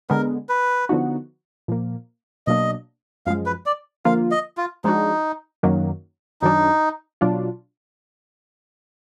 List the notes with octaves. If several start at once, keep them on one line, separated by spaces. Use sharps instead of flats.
D3 G#3 B3 A#4
B4
D3 F3 B3 D#4 F#4
A#2 F3 A#3
B2 F#3 A#3 D4 D#5
F#2 F3 G#3 F5
B4
D5
D3 F3 A#3 F4 F5
D#5
F4
F3 G#3 D4 D#4 F#4
F#2 D#3 F#3 A#3
F#2 D#3 F#3 D4 D#4
B2 F#3 D4 F4